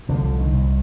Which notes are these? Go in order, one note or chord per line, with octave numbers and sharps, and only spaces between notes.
C2 D3 F3
D#3
C2